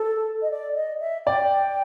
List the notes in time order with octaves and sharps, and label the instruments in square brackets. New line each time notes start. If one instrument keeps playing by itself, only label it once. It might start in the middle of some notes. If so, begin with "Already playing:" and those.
Already playing: [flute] A4
D#5
D5
D#5
E5
[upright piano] D5 [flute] G5